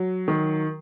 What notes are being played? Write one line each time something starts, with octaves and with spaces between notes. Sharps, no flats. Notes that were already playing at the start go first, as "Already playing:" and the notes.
Already playing: F#3
D#3